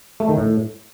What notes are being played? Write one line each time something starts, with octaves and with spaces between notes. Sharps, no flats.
A3
D#3
A2